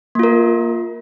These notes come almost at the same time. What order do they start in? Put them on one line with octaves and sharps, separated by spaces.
A#3 F4 A#4